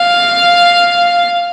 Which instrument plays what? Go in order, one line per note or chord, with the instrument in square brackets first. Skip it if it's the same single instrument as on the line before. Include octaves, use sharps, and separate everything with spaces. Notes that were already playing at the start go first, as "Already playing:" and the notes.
Already playing: [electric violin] F5